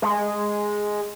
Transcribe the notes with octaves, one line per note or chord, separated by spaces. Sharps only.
G#3